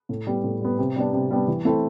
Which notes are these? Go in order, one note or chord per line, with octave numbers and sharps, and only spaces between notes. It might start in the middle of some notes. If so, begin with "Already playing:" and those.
A2
G3 B3
A2
G3 B3
C3
G3 B3 D4
C3
G3 B3 D4
E3
A3 C4 E4